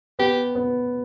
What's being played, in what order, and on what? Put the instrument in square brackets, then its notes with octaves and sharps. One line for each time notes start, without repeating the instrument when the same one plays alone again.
[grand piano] B3 [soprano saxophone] G4
[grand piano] B3